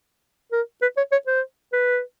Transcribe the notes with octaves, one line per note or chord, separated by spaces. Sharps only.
A#4
B4
C#5
C#5
C5
B4